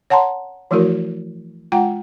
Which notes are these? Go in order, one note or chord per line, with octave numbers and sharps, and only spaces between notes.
C#5 F#5 A5 A#5 C6
E3 F3 A3 E4 F#4 A#4
G#3 F4 F#5 G5 A#5